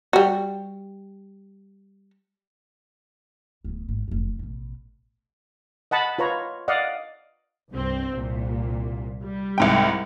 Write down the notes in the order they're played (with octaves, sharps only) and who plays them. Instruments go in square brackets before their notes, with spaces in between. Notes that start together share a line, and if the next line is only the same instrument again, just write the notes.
[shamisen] G3 F#4
[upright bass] D1 B3
G#1
F1 E2
A1 B2
[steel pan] D#5 F#5 A5 B5
F4 B4 C#5 A#5
D5 D#5 F5 F#5
[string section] C2 G2 C4
C2 A#2
G3
[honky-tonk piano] C2 G#2 G5